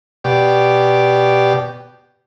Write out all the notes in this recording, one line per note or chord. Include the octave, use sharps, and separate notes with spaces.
B2 G4 D5